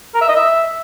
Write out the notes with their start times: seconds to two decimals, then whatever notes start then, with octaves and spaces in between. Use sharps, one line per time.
0.14 A#4
0.22 E5
0.29 D#5
0.36 E5